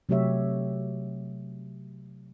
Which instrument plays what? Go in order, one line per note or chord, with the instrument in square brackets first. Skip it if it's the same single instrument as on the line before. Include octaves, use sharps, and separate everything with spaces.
[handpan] C3 F#3 A3 G4 C#5 E5